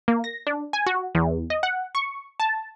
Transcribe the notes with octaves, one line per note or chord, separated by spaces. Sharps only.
A#3
A#6
D4
G#5
F#4
E2
D#5
F#5
C#6
A5